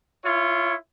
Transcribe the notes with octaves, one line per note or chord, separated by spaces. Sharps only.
E4 F4 C#5